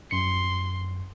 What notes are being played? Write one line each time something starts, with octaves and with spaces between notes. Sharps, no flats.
F#2 C6 C#7